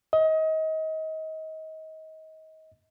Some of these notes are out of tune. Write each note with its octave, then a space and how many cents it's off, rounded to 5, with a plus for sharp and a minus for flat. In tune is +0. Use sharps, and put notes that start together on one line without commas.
D#5 +30